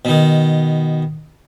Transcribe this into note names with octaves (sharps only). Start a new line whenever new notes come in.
B2 D#3